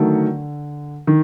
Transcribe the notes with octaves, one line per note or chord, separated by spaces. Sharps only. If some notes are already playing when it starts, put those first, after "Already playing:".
Already playing: D3 D#3 F#3 A3
D#3